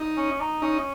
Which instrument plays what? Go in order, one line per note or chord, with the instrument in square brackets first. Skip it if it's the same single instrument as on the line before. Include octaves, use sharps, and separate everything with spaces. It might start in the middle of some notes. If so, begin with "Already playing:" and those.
Already playing: [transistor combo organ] D#4
[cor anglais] C#4
D#4
[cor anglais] C#4 [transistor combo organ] D#4